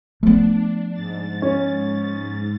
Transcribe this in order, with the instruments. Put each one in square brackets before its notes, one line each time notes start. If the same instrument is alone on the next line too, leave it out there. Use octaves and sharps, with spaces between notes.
[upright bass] F3 B3 [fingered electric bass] A3 [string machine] D4
[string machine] G#2 A6
[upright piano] C#4